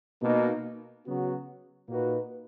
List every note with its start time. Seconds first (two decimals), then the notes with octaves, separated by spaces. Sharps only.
0.21 B2 A#3 D#4
1.04 C#3 F#3 B3 F#4
1.88 A#2 A#3 D#4 F#4 B4